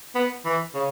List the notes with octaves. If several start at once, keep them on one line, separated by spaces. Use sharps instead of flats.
B3
E3
C#3